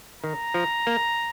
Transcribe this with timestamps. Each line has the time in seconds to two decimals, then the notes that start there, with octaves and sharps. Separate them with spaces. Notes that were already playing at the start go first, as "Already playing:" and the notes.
0.23 D#3 A#5
0.54 F3
0.87 A#3